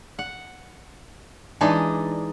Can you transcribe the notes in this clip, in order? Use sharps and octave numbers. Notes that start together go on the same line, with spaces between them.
F#5
E3 G#3 D4 D#4